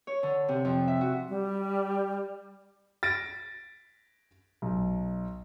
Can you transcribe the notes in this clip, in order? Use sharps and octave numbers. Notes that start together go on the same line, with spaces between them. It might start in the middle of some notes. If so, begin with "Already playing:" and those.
C#5
D3
C3
F2
E5
F#4
G3
A6 A#6 D7
B1